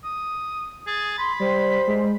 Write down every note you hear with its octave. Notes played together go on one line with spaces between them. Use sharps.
D#6
G#4 A6
B5 C6
G3 C5
G#3